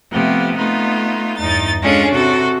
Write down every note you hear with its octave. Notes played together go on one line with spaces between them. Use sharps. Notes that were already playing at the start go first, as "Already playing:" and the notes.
C3 F3 A3 B3 G4
A3 B3 D#4 F4
E2 G2 D#4 A6
G#3 C#4 D4 F4 G#4 A4
C3 F#4 A4